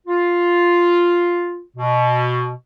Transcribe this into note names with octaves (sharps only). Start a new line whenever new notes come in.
F4
B2